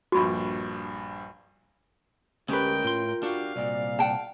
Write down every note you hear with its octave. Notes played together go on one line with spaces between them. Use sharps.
A#1 G2 F#4 B5 C#6
D2 G#3 C#4 G4 A#4 B4 G5
A2 F4 C6
D4 F#4 G4 F5
C2 A#2 D5
F#5 G5 A5